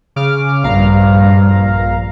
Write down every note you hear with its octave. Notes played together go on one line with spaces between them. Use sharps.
C#3 D6 F6
A#1 G2 F5 A#5